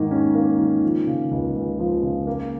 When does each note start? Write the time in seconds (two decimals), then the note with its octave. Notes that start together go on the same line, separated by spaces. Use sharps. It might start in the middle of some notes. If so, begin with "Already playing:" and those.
Already playing: G#2 D#3 A#3
0.11 C#4
0.35 A#3
0.59 D#3
0.83 F3
1.07 C#3
1.31 C#2
1.55 C#2
1.79 F3
2.03 C#3
2.27 A#3